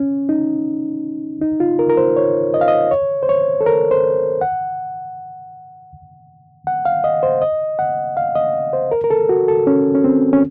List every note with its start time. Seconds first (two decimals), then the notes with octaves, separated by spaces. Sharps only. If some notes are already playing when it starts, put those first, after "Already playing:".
Already playing: C#4
0.29 D#4
1.41 D#4
1.60 F4
1.79 A#4
1.89 A#4
1.97 C5
2.17 C#5
2.54 D#5
2.61 F5
2.68 D#5
2.91 C#5
3.23 C5
3.29 C#5
3.61 A4
3.66 A#4
3.91 C5
4.41 F#5
6.67 F#5
6.85 F5
7.04 D#5
7.23 C5
7.42 D#5
7.79 F#5
8.17 F5
8.35 D#5
8.73 C5
8.92 A#4
9.04 A#4
9.10 A4
9.29 F#4
9.48 A4
9.67 C#4
9.95 C#4
10.04 C4
10.33 C#4